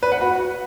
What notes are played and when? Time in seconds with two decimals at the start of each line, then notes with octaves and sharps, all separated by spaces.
0.03 B4
0.12 F#5
0.21 F#4